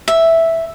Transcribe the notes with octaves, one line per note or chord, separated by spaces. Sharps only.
E5